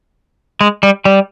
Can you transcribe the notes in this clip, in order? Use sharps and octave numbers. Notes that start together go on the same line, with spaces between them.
G#3
G3
G3